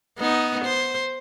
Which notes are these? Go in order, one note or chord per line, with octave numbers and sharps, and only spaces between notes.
B3 D#4
C5